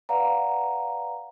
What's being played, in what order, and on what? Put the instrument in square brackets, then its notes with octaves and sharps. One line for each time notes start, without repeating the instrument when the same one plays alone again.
[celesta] B4 D5 F5 F#5 A#5